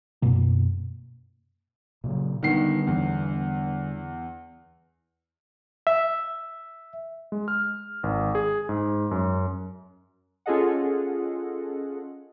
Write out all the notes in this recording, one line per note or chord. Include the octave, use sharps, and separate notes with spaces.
F#2 B2 A#3
A#2 C#3 F#3
D3 D#3 G3 B3 F#5 C7
E2
E5
G#3
F6
G#1
G#4
G#2
F#2
C#4 F4 G#4 A4 D#5 F#5